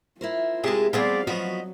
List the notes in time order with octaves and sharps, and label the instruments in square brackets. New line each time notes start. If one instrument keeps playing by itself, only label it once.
[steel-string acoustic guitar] E4 A#4 C5 [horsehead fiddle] F4
[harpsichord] C3 A5 [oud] G#3 G#4
[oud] G3 C4 G#4 [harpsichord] B3 [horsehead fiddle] D5 F5
[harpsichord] F3 B3 [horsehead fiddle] F#3 [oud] F#4 [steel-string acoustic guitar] D#5